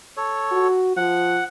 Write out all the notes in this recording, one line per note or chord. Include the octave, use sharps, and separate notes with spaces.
A4 C#5
F#4
F3 F#5